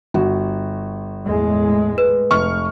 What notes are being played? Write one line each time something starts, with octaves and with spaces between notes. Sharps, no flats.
G1 F#4
E2 A2 G#3
B4
F1 C#6 F6